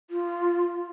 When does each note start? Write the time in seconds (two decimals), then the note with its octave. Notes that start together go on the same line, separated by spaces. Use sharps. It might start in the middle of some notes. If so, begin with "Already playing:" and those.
0.10 F4